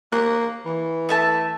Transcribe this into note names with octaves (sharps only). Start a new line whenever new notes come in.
A#3 F#6
E3
A3 E5 A5